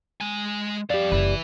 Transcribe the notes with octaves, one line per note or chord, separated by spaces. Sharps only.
G#3 G#5
F2 G4 D5 F5
F#1 E4 B4